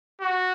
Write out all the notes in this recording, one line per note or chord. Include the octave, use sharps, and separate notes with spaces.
F#4